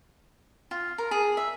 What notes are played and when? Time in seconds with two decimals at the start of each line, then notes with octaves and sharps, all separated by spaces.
0.71 F4
0.98 A#4
1.11 G#4
1.37 E5